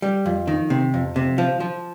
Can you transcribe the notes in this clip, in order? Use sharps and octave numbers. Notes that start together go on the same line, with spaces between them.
G3
F2
D#3
C3
F2
C3
F3
F3